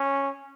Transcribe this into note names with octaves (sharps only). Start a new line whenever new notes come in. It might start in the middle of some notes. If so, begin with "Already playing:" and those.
Already playing: C#4